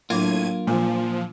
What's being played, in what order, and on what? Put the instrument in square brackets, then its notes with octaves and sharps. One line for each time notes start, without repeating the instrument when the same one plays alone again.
[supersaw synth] A2 G#6 D#7 [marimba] F#3 D4 [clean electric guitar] A#3 F4
[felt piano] A#2 [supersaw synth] F3